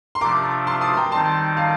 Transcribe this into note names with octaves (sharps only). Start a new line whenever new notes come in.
C6
C3 F3 A3 D4 F4 A#5 D6
A5 C6
C6 D#6
G5 A#5
D#3 G3 C4 D#4 A5 C6
F5 A5